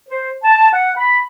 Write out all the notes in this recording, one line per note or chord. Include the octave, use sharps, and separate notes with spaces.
C5
A5
F#5
B5